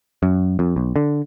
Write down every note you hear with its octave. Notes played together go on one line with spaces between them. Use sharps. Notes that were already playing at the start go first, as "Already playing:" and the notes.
F#2
F2
B1
D3